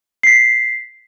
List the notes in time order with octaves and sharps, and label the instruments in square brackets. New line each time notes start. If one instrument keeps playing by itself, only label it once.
[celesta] B6 C7